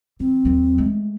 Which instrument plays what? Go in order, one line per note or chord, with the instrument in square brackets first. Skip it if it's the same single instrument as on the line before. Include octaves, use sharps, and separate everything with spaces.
[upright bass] E3 [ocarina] C4
[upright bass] D#2 F#3
G#3 A3